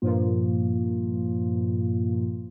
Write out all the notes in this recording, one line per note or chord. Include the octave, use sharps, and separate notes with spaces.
G2 A#2 F3 A#3 F4